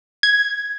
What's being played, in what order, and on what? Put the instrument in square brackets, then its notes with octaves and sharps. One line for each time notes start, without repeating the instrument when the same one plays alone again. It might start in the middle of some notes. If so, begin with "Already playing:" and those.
[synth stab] G#6